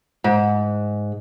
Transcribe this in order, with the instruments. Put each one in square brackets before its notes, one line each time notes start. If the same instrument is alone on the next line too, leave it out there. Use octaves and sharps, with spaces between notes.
[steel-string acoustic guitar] G#2